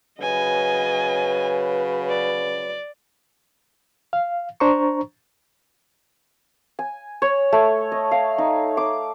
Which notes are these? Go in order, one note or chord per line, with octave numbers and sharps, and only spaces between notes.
C#3 F#3 B4 D#5 G#5
D5
F5
D4 C5 A#5 C#6
G#5
C#5
A3
D#5
F5
D#4
D6